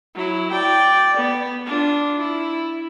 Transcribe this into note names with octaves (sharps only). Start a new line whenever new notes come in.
F#3 E4
D5 G5
B3
D4 F4
E4